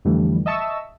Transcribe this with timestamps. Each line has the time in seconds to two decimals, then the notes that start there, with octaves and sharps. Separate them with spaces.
0.05 F2 D3 E3 G3 A3
0.46 D#5 E5 A5 C#6 E6